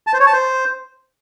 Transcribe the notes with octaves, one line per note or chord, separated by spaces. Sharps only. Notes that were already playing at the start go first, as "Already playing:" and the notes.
A5
C5
C#5
A5
C5